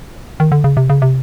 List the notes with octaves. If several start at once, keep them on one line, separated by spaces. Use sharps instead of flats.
D#3
D3
C#3
C3
C#3
C3